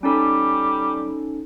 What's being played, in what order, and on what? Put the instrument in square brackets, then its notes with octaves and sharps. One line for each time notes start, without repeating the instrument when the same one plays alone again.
[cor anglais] G3 [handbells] C#4 D#4 A4